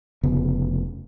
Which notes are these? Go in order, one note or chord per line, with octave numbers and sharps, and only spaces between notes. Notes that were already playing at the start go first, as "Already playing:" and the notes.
F1 C#3 B3